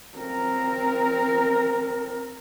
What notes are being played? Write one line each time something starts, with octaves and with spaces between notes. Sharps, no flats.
C4 A#4